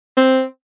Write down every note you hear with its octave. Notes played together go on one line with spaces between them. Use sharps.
C4